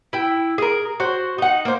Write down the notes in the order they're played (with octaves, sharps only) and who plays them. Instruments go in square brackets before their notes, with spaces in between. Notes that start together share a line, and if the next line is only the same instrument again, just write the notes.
[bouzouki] E4 G5
G#4 A#4
F#4 C5
D#4 F#5
A#3 C5